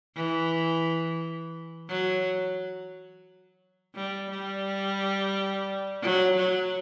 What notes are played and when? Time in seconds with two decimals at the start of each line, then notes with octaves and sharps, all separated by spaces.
0.16 E3
1.89 F#3
3.95 G3
4.30 G3
6.02 F#3
6.36 F#3